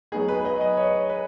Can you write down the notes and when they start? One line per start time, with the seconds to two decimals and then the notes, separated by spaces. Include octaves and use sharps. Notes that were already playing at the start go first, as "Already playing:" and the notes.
0.12 F#3 B3 D#4 G#4
0.28 B4
0.45 D#5
0.61 D#5
0.77 C#5
1.09 B4